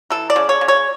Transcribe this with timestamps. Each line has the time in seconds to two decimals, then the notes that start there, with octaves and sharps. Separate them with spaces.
0.10 E3 A4
0.30 D5
0.36 C#3
0.49 C#5
0.61 C#3
0.68 C#5